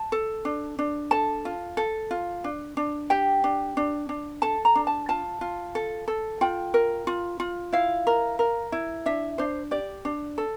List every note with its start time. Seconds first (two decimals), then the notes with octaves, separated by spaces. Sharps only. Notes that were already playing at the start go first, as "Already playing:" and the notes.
Already playing: A5
0.12 A4
0.45 D4
0.79 D4
1.11 A4 A5
1.45 F4
1.77 A4
2.11 F4
2.44 D4
2.77 D4
3.10 G4 G5
3.44 D4
3.77 D4
4.09 D4
4.42 A4 A5
4.65 A#5
4.75 D4
4.87 A5
5.09 F4 A5
5.41 F4
5.75 A4
6.08 A4
6.41 F4 G5
6.74 A#4
7.07 F4
7.40 F4
7.72 E4 F5
8.07 A#4
8.39 A#4
8.72 E4
9.06 D4 E5
9.38 D4 C5
9.71 G4 D5
10.05 D4
10.38 A4